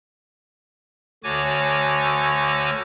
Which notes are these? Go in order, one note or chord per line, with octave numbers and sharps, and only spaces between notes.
D2 D3 F#4 C#5 G#5 D6